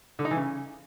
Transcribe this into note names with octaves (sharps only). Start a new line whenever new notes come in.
D3
D#4
E3
C#3